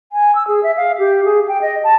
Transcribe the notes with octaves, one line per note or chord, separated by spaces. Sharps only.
G#5
E6
G#4
E5
F5
G4
G#4
G5
D#5
A5